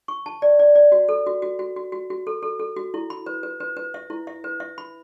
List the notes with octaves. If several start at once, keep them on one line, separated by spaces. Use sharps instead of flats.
C#6
A5
D5
D5
D5
F#4
A4
F#4
F#4
F#4
F#4
F#4
F#4
A4
A4
A4
F#4
E4
B5
B4
B4
B4
B4
E5
E4
E5
B4
E5
B5